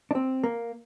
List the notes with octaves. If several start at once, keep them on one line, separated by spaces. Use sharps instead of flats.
D4
C4
A#3